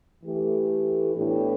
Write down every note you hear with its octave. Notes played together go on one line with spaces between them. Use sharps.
E3 A3 G4
A2 E3 B3 D4 G4